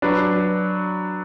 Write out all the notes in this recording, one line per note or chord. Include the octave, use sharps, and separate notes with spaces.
F#3 D4 B4